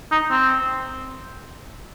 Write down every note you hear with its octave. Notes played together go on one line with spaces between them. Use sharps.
D#4
C4